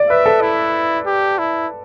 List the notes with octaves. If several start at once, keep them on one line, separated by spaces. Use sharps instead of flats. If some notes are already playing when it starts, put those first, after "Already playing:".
Already playing: D5
B4 E5
A4
E4
G4
E4